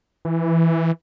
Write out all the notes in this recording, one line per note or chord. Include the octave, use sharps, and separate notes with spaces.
E3